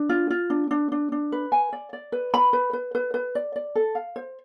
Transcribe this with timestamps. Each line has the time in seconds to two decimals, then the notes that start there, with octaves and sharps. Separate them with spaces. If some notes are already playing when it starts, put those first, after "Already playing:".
Already playing: D4
0.09 F4
0.30 F4
0.50 D4
0.71 D4
0.92 D4
1.12 D4
1.32 B4
1.52 G#5
1.73 D5
1.93 D5
2.12 B4
2.34 B5
2.53 B4
2.73 B4
2.95 B4
3.14 B4
3.35 D5
3.56 D5
3.75 A4
3.95 F5
4.16 C5